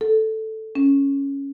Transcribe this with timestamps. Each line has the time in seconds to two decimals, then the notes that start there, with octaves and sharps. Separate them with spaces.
0.01 A4
0.75 C#4